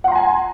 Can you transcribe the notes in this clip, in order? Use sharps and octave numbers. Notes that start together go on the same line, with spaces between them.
F#5 G#5 A#5 C6